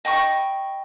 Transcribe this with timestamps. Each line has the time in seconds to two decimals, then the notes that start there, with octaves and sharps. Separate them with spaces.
0.05 D#5 G5 B5 C#6